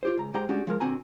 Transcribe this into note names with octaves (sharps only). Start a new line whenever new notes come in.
F4 G4 C5
C#2 A#5
G#2 G#3 G4 C5 G5 A#5
G#3 A3 C#4 D4 F#4 G4
F3 G#3 A#4
A#2 D3 C4 F#4 G#5 A#5